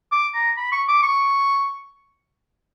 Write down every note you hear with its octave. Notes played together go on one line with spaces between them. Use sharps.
D6
A#5
B5
C#6
D6
C#6